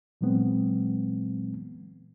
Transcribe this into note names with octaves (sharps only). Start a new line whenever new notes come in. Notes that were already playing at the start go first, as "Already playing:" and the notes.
A#2 E3 F#3 G#3 B3 C4